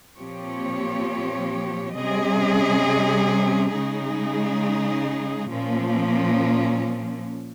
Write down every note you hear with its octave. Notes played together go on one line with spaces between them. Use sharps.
A#2 F3 C4 G4 C#5
C3 G3 C#4 G#4 D#5
C#3 G#3 D#4 G#4
A#2 F3 A#3 C#4